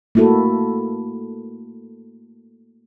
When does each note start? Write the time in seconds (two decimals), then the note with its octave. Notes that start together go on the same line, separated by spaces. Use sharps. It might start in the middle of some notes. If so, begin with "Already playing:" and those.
0.15 A3 A#3 E4 F#4 A4